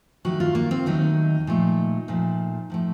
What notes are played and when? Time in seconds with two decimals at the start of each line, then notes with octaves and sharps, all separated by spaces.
0.25 D#2 D#3 F#3 A3 F#4
0.40 F4
0.55 A#3
0.71 C4
0.86 D#2 D#3 F#3 A3 D#4
1.47 A#2 F3 A3
2.08 A#2 F3 A3
2.70 A2 F3 A3